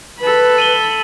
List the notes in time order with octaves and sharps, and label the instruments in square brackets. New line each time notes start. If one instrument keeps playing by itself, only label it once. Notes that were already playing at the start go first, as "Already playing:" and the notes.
[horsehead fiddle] A4 B5 [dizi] B4
[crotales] D#7 F#7 G7